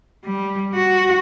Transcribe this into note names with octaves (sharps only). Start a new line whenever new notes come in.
G3
F#4